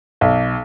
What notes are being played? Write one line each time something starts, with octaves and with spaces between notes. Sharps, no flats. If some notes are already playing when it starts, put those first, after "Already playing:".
B1